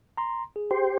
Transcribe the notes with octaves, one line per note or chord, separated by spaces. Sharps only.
A#5 C6
G#4
G4 C5